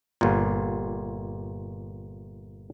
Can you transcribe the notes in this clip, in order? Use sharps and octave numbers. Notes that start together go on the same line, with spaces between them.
G1 A#2